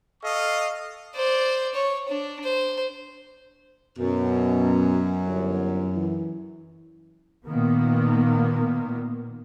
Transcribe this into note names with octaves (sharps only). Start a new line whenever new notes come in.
A4 D#5 F5 C#6
C5 D5
C#5
D4
C5
F#2 B2
G1
E3
A#2 D#3 A#3 B3